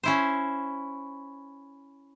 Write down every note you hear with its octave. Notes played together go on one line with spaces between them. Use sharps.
C#4 E4 C5